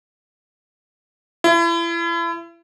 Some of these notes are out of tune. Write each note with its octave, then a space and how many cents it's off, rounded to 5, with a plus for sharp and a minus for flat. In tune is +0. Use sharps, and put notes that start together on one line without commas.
E4 +35